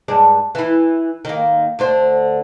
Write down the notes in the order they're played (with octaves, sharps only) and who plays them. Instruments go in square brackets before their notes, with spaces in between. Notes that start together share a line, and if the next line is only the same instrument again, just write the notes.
[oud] G2 G#3 D4
E3 E4
D#3 A#3
D2 D3 C5